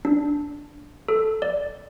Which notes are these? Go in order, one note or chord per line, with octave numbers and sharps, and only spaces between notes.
D4
A4
D5